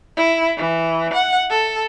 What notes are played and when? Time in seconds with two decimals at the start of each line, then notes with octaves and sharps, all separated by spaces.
0.17 E4
0.57 E3
1.13 F#5
1.50 A4